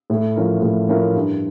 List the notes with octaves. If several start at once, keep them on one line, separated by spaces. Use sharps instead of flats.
A2
F3 C#4 E4 A#4
A2
F3 C#4 E4 A#4
G2